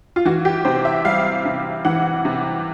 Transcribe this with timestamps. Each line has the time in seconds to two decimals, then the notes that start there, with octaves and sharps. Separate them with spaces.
0.16 F4
0.25 E3 F#4
0.45 G4
0.65 C3 C5
0.85 E5
1.05 G3 F5
1.45 C3
1.85 E3 F#5
2.25 C3